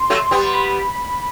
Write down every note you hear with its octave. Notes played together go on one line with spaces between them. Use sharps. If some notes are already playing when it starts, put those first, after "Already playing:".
Already playing: C6
F#3 A3
G3 B3
B5